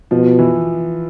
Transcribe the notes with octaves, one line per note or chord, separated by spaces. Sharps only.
B2 F3
E3